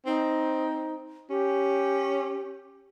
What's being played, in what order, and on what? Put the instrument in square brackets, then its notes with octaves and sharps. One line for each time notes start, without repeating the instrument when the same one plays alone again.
[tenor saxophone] C4 [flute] D#4
[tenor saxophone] C#4 [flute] G4